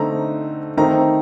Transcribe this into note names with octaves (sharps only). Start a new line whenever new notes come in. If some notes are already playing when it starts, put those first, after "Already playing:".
Already playing: D3 A3 C4 D#4 A#5
D#3 A3 C4 D#4 A#5